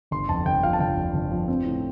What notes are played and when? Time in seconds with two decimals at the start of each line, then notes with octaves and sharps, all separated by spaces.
0.11 G1 C6
0.29 F2 A5
0.45 G1 G5
0.63 F3 F5
0.73 A5
0.80 G1 G5
0.97 F2
1.14 G1
1.31 F3
1.48 C4
1.66 A2